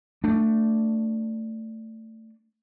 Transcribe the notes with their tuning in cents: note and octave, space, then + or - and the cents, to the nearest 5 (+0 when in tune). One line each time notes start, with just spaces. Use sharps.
A3 +20 D4 +0